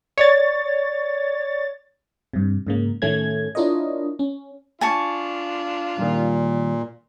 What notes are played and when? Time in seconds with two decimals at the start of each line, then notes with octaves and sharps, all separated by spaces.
0.18 C#5 D5 A6
2.33 G2 C3
2.67 G#2 C#3 A#3
3.02 A2 D#3 A3 C#4 G#6
3.55 D4 E4 F4 A#4 C#5 D#5
4.19 C#4
4.81 D4 F4 G#5 A5 C#6
5.98 A#2 D#3 G3